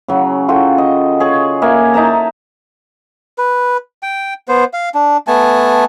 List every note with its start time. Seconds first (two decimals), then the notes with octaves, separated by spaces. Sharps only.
0.08 C#3 F#3
0.48 F4 F#4 A4 G5
0.78 D#5
1.20 G#4 C#5
1.62 A#3 E5 G#5
1.94 D#4 E5 A5 A#5
3.38 B4
4.03 G5
4.48 B3 C5
4.73 F5
4.95 D4
5.27 A3 B3 G#5 A5